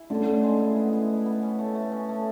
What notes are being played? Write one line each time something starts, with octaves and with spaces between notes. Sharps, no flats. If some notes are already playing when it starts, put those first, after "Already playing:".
Already playing: E4 G#4
D3 A3 C#4
E4
G#3
E4
B3
E4
E4
B3
C#4
A3
A3
C#4
A3